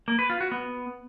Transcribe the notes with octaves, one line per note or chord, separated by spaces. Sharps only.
A#3
B4
F4
F#4
B3